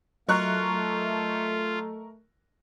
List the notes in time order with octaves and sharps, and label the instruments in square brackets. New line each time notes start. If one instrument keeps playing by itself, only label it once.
[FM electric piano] F#3 D#5 [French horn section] A3 [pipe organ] F4 [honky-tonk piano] A#4 C#6 F#6